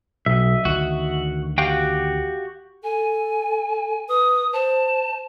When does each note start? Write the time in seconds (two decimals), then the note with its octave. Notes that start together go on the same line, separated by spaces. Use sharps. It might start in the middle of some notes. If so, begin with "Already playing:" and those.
0.26 B1 D#5 E5
0.65 D2 D#3 F#4
1.58 F#4 G4 F5 G5
2.84 A4 G#5
4.09 B4 D#6
4.53 C5 A5